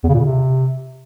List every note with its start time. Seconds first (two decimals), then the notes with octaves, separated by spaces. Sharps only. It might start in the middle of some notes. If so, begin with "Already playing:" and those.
0.04 E2
0.09 C#3
0.14 A#2
0.20 C#3
0.25 C3